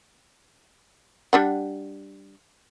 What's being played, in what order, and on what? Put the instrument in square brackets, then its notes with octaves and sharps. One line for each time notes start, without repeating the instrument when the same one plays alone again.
[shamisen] G3 D4 F#5